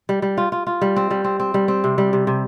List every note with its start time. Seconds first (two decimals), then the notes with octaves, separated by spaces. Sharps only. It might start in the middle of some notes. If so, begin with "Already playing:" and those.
0.09 G3
0.22 G3
0.38 F4
0.52 F4
0.67 F4
0.81 G3
0.96 C4
1.11 G3
1.24 C4
1.40 C4
1.54 G3
1.68 C4
1.84 C3
1.98 G3
2.13 C3
2.27 C3